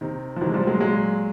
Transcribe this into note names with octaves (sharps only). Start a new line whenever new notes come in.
C3 D#3
F3
C3 D#3 E3 F#3
G#3
F3 G3
F#3 G#3
A#2 F#3 G#3